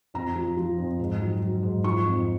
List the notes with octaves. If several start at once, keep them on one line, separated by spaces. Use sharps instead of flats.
F2 A#5
F3
F3
F2
G#2
F#3
F#3
G#2
F3 C#6
F2